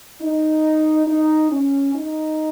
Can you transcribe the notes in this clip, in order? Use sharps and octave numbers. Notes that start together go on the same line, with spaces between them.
D#4
D#4
C#4
D#4